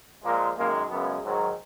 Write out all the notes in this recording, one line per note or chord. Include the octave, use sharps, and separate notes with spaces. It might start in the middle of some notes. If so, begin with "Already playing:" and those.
A#2 F3 G#3 A#3
F#2 D#3 G#3 A#3
F#2 C#3 G#3 B3
G#2 D#3 F#3